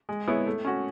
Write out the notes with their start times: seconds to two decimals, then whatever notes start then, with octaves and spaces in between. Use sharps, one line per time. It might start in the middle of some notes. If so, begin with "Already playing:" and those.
0.09 G#3
0.28 B3 E4 G#4 C#5
0.46 A3
0.65 C#4 F#4